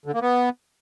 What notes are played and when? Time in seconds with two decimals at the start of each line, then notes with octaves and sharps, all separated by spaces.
0.06 D3
0.14 A#3
0.22 B3